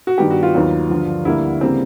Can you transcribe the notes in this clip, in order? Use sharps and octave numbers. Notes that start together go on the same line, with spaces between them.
F#4
G2 D#3 G3 B3 G4
F#4
F4
D#2 D#3 F#3 B3
G2 D3 F3
D2 D3 G3 A#3 E4
C#3 E3 G3 A#3 C4